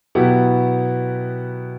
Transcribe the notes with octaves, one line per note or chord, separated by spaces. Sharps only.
B2 F#3 B3 E4 G4